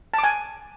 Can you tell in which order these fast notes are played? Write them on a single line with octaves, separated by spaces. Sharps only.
A5 D6 G#5